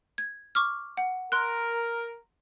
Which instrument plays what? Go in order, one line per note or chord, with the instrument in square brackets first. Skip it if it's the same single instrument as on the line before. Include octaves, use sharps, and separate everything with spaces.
[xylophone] G#6
C#6 D6 F6
F#5
[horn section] A#4 [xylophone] C6 F#6